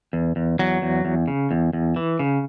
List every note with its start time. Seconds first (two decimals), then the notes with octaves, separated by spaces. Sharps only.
0.13 E2
0.36 E2
0.59 E2 F#3
0.82 E2
1.05 E2
1.28 C#3
1.51 E2
1.73 E2
1.96 E3
2.19 C#3